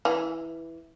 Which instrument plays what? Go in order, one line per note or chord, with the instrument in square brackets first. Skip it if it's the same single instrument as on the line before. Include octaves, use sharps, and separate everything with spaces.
[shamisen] E3